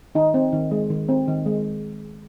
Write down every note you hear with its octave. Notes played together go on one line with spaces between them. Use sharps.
D#3 D#4
C4
D#3
G#3
D#3
C4
D#3
G#3